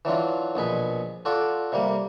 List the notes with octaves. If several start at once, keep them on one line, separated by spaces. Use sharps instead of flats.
E3 F#3 D4 F4
A#1 B2 G#4 B5
F4 F#4 A4 D5
C3 G3 A#3